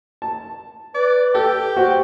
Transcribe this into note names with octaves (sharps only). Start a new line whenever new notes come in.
A5
B4 D5
G4 A4
F#4 C5